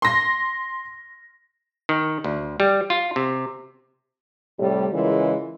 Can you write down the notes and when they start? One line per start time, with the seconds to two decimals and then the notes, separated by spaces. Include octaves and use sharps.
0.02 C6 A#6
1.89 D#3
2.24 D2
2.60 G3
2.90 F4
3.16 C3
4.60 A2 C3 G3
4.93 C#3 E3 G#3 F4 A#4